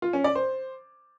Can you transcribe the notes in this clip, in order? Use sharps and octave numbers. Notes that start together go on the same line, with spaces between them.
F4
C#4
D5
C5